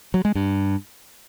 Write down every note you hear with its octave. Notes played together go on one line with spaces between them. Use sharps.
F#3
G#3
G2